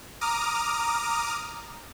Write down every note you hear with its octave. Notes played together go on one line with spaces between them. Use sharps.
A#5 D6 D#6 F6